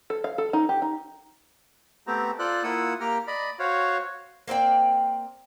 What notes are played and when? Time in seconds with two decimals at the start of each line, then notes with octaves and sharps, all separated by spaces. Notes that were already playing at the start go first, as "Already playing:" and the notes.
0.10 A4
0.24 F5
0.38 A4
0.53 D#4
0.69 G4
0.82 D#4
2.07 A3 B3 C4 G4 C5 A#5
2.39 F4 A4 C5 D5 F#6
2.63 A#3 E4 F4 F#5 D#6 E6
3.00 A#3 G4 G5 A#5 F6
3.27 D5 D#5 B5
3.59 F#4 C5 C#5 F5
4.48 A#3 C4 D5 G5